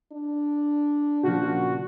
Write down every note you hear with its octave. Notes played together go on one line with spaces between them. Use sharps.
D4
A#2 C#3 F3 F#4